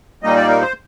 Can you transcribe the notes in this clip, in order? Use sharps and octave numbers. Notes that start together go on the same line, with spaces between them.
A#2 G3 A#3 D#4 D#5
D5
A#4
C5